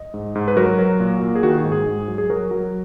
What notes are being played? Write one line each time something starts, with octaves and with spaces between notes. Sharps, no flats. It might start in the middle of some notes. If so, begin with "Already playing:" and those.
Already playing: D#5
G#2
G#2
B4
F#3 F#4 A#4
F#3
A#2
A#2
G#4
D#3 F#4
G#4
G#2
G#4
G#2
F#3
G#4
F#3 F#4 A#4
F#3